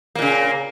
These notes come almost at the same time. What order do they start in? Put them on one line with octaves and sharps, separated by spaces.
A#3 A#2 C#3